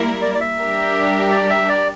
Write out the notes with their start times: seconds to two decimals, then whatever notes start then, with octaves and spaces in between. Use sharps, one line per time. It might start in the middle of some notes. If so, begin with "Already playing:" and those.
Already playing: G3 A#3 E4 A#4
0.22 D5
0.35 D5
0.40 E5
0.59 G3 D4 G4 A#4
1.32 D5
1.50 E5
1.69 D5